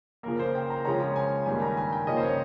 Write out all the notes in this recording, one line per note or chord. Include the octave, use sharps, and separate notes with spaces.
C#3 F3 A#3 A#4
C5
G5
A#5
C#3 F3 G#3 C#4 A#5
G#5
G2 D#3 G3 A#3 G#5
A#5
G#5
G5
C#3 F3 A#3 C#4 D#5
C5
C#5